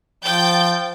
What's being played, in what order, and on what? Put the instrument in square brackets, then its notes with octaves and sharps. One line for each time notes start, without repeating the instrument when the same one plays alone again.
[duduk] F3 [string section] G5 G6 A6